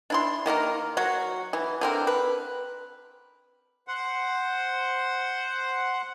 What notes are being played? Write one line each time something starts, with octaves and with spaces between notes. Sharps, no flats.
D4 E4 C6
D#3 A#3 F#4 A#4
F#3 F#4
E3
D3 C4 A#4
B4
C5 F#5